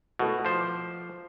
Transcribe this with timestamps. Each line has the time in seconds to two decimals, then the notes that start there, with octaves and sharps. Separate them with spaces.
0.19 B2 A3 E4 F#4
0.45 F3 C5
0.61 D6